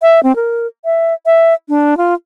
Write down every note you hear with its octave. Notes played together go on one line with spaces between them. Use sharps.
E5
C4
A#4
E5
E5
D4
F4